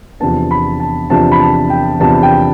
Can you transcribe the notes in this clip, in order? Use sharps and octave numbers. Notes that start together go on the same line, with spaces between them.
E2 C3 F3 B3 D4 A5
B5
A5
E2 C3 F3 B3 D4 A5
B5
A5
G5
E2 C3 F3 B3 D4 A5
G5